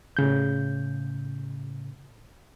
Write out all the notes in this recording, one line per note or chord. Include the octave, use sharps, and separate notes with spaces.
A2 C#3 G6